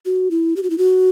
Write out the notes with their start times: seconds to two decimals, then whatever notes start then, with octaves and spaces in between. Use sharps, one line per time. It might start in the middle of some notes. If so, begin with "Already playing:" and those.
0.05 F#4
0.31 E4
0.56 G4
0.63 F#4
0.70 E4
0.78 F#4